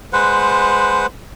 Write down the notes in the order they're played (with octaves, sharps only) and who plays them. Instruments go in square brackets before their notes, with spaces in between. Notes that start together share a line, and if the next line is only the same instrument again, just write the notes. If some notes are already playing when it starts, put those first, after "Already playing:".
[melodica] G#3 B4 C5 F#5